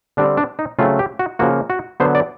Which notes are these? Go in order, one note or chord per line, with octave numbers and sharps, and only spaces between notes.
D3 G3 C4 D4
D4
D#4
C#3 F#3 A3 C4 F4
G4
F#4
C#3 F3 A#3 F#4
F#4
D3 F#3 B3 C5
D5